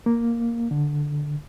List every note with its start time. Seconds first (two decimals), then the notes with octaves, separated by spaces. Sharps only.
0.06 A#3
0.71 D3